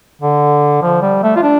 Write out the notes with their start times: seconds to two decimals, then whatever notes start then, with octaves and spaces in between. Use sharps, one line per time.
0.21 D3
0.82 F3
1.02 G3
1.23 A3
1.36 F4
1.42 D4